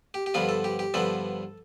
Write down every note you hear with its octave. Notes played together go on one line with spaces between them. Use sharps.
G4
G4
G2 D3 F3 B3 F4
A4
G4
G4
G2 D3 F3 B3 A4